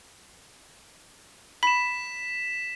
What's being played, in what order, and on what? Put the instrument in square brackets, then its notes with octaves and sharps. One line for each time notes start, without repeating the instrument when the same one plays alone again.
[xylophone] B5 [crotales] B6 E7